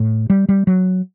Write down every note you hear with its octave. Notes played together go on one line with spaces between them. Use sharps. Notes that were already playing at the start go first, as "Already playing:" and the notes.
Already playing: A2
G3
G3
F#3